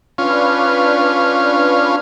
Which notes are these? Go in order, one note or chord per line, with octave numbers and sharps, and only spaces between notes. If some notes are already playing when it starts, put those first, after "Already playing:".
C#4 D4 F4 B4